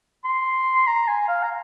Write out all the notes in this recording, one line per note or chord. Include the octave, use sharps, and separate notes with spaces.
C6
A#5
G#5
F5
A#5